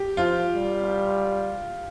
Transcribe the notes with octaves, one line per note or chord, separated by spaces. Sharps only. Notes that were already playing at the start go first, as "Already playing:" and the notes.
Already playing: G4
F3 F4
G3